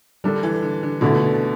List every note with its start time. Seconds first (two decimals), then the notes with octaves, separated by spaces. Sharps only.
0.24 D3 G3 D4 A4
0.43 E3
0.62 D3
0.83 D3
1.01 B2 D3 A3 E4 A4